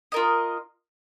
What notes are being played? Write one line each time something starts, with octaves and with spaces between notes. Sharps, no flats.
F4 A#4 D#5